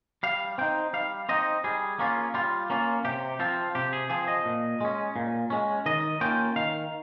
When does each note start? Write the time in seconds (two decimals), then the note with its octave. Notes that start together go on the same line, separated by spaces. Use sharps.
0.23 G3 F5
0.58 C4 D#4 G5
0.93 G3 F5
1.29 C4 D#4 D#5
1.64 G3 G#4
1.99 A#3 C#4 F4
2.34 G3 F4
2.70 A#3 C#4 F4
3.05 C3 G4
3.39 F3 C4 F4
3.75 C3 G4
3.93 G#4
4.10 F3 C4 G#4
4.28 D#5
4.45 A#2
4.81 G#3 C#4
5.16 A#2
5.50 G#3 C#4
5.86 D#3 D#5
6.21 A#3 C#4 F4 G5
6.56 D#3 F5